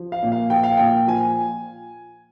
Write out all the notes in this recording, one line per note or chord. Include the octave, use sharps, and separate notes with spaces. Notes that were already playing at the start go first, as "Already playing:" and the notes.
Already playing: F3
F5
A#2
F5
F3 G5
F5
A#2 G5
F3 G#5